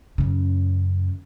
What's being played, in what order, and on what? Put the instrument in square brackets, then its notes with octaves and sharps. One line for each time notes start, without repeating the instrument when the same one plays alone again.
[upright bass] F#2 C#3